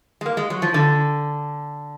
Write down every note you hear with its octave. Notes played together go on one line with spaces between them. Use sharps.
G#3
A#3
G#3
F#3
F3
D3